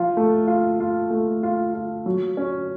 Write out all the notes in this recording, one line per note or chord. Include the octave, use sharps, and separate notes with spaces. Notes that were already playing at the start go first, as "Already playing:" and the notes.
Already playing: F3 F4
A3
F4
F4
A3
F4
F4
F#3
C#4